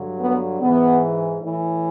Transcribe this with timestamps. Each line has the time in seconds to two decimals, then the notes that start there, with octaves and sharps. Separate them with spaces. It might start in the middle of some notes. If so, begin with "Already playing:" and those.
Already playing: G2 D3 F#3
0.21 B3
0.61 G#2 E3 B3
1.43 A2 E3